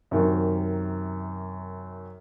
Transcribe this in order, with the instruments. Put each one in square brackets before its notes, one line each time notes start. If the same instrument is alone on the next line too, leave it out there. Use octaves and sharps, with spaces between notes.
[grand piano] F#2 C3 D#3